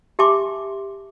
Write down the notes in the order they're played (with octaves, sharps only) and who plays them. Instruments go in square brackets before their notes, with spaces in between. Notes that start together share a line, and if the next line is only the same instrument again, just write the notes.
[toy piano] G4 E5 G#5 A5 C6 D6